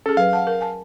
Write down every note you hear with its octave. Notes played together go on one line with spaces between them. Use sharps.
C#4 G#4 A4
F#3 B4 F5
F#5 A5
A#4
G#5 A5